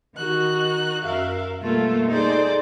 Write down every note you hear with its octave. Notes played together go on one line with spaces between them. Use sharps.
D#3 D#4 F#4 F#6
F#2 A#4 E5 F5
B2 G3 A3 A#3 F4 A4
D#4 G#4 A4 C5 D5